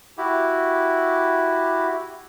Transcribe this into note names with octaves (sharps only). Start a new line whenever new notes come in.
E4 F#4 G4